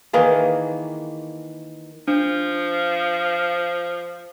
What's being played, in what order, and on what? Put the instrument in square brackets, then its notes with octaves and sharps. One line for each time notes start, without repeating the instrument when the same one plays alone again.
[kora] D#3 E3 A#3 G#4
[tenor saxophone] F3 [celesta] D4